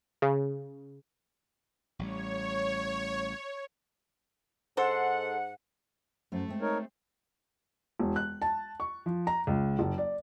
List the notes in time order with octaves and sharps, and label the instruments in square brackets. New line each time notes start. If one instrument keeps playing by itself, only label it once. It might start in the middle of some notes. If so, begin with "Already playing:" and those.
[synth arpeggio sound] C#3
[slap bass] A1 G3 [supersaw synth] C#5
[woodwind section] G#2 F#5 [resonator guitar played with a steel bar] A4 C5
[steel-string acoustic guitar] F#2 C5 [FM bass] A3
[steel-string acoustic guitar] G#3 C4
[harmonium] D#4 A#4 C#5
[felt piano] E1
F#6
A5
C#6
F3
A#5
C#2
F#1
D5